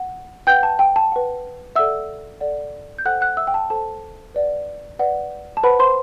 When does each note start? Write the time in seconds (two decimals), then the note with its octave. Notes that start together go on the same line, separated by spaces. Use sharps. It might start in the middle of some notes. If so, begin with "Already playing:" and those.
Already playing: F#5
0.47 B4 F#5 G5 G6
0.63 A5
0.79 G5
0.96 A5
1.12 B4 F#5
1.76 A4 D5 E5 F#5 E6
2.40 A4 D5 F#5
2.98 G6
3.05 A4 C5 F#5 G5 F#6
3.21 F#5 F#6
3.37 E5 E6
3.47 G5
3.54 A5
3.70 A4 C5 G5 A5
4.34 B4 D5 F#5
4.99 B4 D5 F#5
5.57 A5
5.64 B4 C5 F#5 B5
5.79 C5 C6